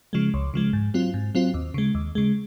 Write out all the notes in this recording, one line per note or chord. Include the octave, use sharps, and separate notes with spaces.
C#3 F3 G#3
C#2
C#3 F3 G#3
G#2
F#3 C4 F4
G#2
F#3 C4 F4
D#2
C#3 G#3
D#2
C#3 G#3